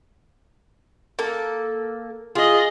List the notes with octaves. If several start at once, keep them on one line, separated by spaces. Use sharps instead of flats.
A#3 A4
F4 G#4 D#5